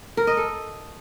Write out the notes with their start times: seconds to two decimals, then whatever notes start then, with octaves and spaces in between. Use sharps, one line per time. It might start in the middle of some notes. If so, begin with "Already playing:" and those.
0.17 A#4
0.27 D#5
0.37 A4